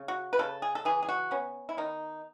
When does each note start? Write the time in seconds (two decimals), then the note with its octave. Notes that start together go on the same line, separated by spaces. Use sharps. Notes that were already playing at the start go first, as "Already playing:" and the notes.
Already playing: C#3
0.08 F#4
0.33 B4
0.39 C#3 A4
0.62 G#4
0.75 A4
0.85 E3 G#4
1.03 G#4
1.09 F#4
1.31 B3 C#4
1.69 E4
1.77 D#3 D#4